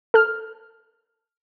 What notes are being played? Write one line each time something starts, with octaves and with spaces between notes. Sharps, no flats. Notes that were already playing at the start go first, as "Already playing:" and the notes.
A4 F6